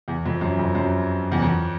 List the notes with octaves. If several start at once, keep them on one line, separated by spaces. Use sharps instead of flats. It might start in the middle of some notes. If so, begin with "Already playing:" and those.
E2
F2
F#2
F2
F#2
E2
F2